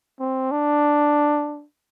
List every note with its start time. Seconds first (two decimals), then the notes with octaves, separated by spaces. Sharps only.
0.20 C4
0.51 D4